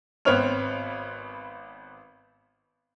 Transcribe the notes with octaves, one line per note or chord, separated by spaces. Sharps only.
G#1 B3 C4 C#5 F6 F7